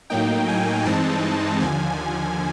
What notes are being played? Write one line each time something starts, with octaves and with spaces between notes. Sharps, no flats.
A2 F#3 A#3 D#4 G5
G#5
G2 E3 G#3 C4 D#4 A5
D#2 D3 F3 G#5